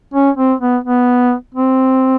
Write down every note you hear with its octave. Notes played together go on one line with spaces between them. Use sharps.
C#4
C4
B3
B3
C4